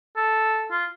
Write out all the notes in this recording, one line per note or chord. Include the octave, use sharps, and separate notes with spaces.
A4
F4